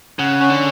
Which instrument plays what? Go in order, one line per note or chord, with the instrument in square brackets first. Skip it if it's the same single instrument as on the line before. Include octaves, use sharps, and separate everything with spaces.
[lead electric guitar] C#3 [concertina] F#5
[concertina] C#4
[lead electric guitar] D3